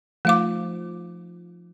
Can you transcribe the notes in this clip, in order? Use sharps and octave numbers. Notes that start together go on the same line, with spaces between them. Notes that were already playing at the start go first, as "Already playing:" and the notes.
F3 A3 D#4 F5 D6